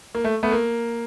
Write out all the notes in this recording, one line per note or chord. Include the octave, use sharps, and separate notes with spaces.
A#3
A3
A3 B3
A#3